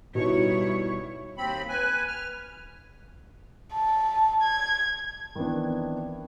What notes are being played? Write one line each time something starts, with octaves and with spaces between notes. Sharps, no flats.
B2 G3 D#4 E4 C#5
D#2 C4 B5
B4 G#5
F6
A5
G#6
D#3 E3 B3 C4 D4